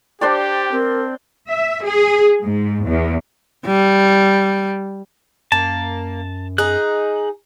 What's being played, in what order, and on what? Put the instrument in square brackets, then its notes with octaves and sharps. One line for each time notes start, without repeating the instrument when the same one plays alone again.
[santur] D4 C5 D5 [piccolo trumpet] G4 [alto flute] G5
[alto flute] C4 [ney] A#4
[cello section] E5
G#4
G#2
E2
[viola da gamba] G3
[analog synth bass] F#2 [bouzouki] A#3 [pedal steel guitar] A5
[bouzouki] D#4 G#4 [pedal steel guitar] F#6